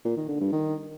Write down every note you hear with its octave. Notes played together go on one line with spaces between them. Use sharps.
A#2
D#3
D3
G2
D#3